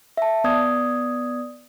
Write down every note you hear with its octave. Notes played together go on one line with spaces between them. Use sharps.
E5 A5
B3 D5 D#6 G#6